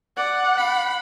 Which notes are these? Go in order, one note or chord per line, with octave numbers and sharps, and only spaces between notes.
D5 F#5
B5